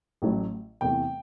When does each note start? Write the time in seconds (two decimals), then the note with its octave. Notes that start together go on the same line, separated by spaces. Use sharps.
0.22 A1 A2 F#3 A3
0.81 E2 C3 E3 A3 G5